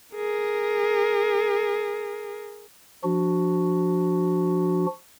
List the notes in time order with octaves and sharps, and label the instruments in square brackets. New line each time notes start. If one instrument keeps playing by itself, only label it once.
[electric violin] G#4 A#4
[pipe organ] F3 D4 F#4